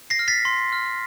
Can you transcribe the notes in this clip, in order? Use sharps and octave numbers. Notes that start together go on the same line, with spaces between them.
A#6 C7
F6
A6 B6
C6
F6